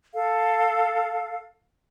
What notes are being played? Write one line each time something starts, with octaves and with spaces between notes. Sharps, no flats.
A4 F5